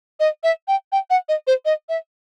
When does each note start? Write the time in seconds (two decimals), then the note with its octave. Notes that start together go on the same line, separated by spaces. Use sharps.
0.20 D#5
0.44 E5
0.68 G5
0.92 G5
1.10 F#5
1.29 D#5
1.47 C5
1.65 D#5
1.89 E5